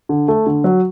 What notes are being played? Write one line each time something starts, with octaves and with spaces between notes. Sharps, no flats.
D3
A3
D3
F#3